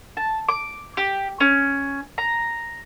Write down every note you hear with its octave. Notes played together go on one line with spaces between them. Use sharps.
A5
D6
G4
C#4
A#5